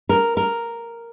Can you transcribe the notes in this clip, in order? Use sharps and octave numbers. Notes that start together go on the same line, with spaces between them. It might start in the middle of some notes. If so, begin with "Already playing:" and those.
A#4
A#4